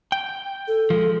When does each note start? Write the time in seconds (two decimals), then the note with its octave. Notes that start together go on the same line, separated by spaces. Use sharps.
0.12 G5
0.68 A4
0.90 F3 G#3